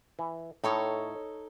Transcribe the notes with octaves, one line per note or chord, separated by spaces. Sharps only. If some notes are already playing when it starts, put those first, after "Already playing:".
E3
A2 D#4 A4 C#5